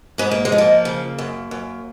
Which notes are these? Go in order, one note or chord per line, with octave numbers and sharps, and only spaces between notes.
G#2 B3
A#3
G#3
F3
A#3
C#3
F#2
F#2